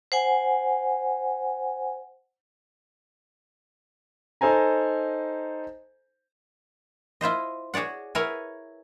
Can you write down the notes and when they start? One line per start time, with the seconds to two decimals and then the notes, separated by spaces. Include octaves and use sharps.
0.12 C5 F#5 G#5
4.41 D#4 A4 C5 G#5 A#5
7.21 E4 F4 C5 D#5
7.74 F#4 G#4 C#5 D5 F#5
8.15 E4 A#4 B4 C#5 F#5 G#5